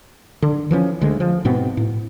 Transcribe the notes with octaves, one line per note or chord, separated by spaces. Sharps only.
D3
E3 F3 G#3 C#4
D2 D3 G#3
F3
G#2 B2 B3 C4
A2